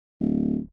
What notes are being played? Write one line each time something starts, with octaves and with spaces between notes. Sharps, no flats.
D1